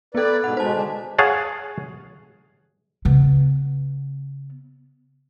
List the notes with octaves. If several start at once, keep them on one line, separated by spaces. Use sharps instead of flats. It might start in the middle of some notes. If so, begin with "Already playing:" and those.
B3 A4 B4 D5
G#2 B2 B4 F#5
B2 G#3 C5 A5
D3 G#3 D4
G#4 C#5 F5 F#5 A5
C#3 B3